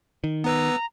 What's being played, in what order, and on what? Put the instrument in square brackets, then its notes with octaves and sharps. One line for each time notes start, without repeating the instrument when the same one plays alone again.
[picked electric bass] D#3
[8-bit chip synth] B3 B4 E6 [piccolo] A#5